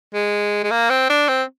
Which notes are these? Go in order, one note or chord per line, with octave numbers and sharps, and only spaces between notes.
G#3
G#3
A#3
C4
D4
C4